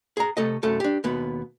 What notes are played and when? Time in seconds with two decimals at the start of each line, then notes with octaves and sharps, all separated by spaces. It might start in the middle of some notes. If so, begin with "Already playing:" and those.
0.17 G#4 A#5
0.37 C3 A3 A4 D#5
0.63 C2 F#2 A3 A4
0.80 D4 G4
1.04 D#2 B2 B3